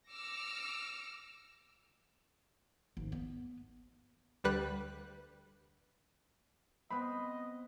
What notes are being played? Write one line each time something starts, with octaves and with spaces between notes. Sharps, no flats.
D6 E6 F6 A#6 C#7
G#1
B3
D2 G3 B4 F#6
B3 C4 D#5 B5